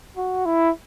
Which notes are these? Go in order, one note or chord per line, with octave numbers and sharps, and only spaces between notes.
F#4
E4